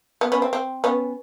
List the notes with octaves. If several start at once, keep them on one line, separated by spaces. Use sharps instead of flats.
B3
B3 C#4
C4
C4
B3 C#4